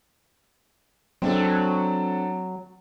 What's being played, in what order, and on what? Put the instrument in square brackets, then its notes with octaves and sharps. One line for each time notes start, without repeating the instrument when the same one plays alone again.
[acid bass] F#3 [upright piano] C4 D4 A4